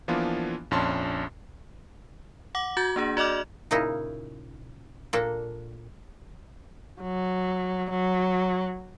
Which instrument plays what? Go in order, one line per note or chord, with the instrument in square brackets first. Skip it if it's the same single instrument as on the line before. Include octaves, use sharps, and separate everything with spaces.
[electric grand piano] E3 F3 A#3 B3 D4 F4
A#1 F2 C#4 D4 A5 C6
[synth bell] F#5 D6
F#4 G6 A6
A#3 D4 G#4
F#4 D5 D#5 D6 F6
[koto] A#2 C#3 A#3 D#4 E4
A#2 A#3 D4 A4
[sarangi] F#3
F#3